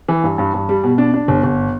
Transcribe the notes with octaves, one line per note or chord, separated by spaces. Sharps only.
E3
G2
G2
G2
G3
B2
D4
D4
G1
G1